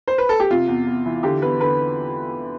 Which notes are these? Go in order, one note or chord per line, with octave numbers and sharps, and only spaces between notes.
C5
B4
A4
G4
C3 F4
E2
E2
E3
D3 G4
E2 B4
D3 B4